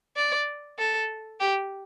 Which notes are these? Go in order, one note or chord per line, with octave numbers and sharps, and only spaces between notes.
D5
A4
G4